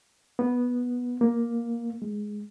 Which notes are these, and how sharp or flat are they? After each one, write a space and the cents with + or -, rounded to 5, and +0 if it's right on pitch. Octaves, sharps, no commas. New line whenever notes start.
B3 -10
A#3 +10
G#3 +5